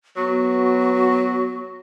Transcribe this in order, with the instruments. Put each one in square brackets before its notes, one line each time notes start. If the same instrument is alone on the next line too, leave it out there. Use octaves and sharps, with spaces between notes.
[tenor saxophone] F#3 [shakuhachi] B3 [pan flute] F#4